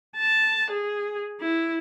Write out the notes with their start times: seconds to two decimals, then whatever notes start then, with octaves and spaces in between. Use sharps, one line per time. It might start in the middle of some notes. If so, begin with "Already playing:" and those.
0.17 A5
0.71 G#4
1.41 E4